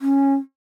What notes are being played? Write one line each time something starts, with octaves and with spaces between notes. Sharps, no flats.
C#4